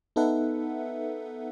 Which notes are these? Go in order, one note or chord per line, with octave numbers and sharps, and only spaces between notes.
B3 D#4 A4 B4 E5 F#5